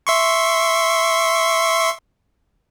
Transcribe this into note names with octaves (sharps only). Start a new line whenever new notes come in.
E5 C6 C#6